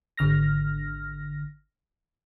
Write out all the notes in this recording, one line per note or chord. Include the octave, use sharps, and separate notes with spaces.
G#1 D3 F6 A#6